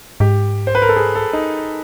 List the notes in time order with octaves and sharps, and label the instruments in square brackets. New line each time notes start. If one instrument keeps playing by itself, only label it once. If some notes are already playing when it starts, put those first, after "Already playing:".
[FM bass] G#2 [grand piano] G4
[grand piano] C5
B4
A#4
A4
G#4
A4
D#4